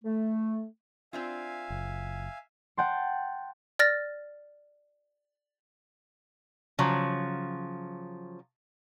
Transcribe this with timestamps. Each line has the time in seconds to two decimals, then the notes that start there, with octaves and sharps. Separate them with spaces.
0.05 A3
1.13 C4 D4 F4 E5 F5 G#5
1.70 F#1
2.77 F#5 G5 A5 C6
3.79 D5 F6 A6 A#6
6.79 C#3 F3 F#3